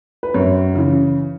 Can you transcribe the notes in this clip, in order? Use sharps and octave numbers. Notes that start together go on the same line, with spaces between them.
B4
F#2 C#5
C#3 E3